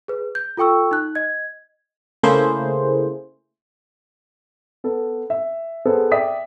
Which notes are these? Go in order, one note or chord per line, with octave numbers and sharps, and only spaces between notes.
G#4 B4
G6
F4 A4 G5 C#6 E6
D#4 F#6
D#5 G#6
C#3 A3 A#3 E4 G#4 C5
B3 A4
E5
B3 G#4 A4 C5
D5 E5 G5 D#6 B6